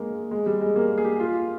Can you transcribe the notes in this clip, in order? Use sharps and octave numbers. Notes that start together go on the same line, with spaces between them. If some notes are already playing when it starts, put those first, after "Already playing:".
Already playing: G#3 A#3
G#3
G3
G#3
A#3
G#4
G4
F4